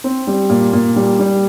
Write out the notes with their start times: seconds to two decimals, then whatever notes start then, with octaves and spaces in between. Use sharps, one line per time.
0.04 C4
0.27 G3
0.49 A#2
0.73 A#2
0.96 G3
1.19 G3